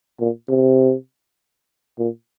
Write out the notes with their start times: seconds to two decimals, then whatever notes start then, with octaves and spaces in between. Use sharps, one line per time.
0.20 A#2
0.49 C3
1.99 A#2